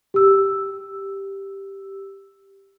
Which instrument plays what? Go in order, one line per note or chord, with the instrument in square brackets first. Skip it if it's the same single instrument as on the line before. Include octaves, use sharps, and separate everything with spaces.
[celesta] G4 E6